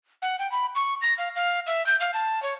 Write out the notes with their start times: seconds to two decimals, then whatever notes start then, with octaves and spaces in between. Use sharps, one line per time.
0.22 F#5
0.39 G5
0.52 B5
0.75 C#6
1.01 A#6
1.18 F5
1.35 F5
1.67 E5
1.86 G6
2.00 F5
2.14 A5
2.42 C#5